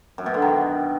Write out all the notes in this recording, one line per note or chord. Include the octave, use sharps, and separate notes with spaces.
F#2
B2
D3
D#3